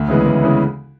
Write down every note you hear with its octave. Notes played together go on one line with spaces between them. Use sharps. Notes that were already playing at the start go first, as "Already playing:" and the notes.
Already playing: D2
C#3 E3 G#3 B3
D2
C#3 E3 G#3 B3